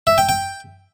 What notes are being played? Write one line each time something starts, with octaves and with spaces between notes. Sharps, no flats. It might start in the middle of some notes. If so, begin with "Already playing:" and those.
E5
G5
G5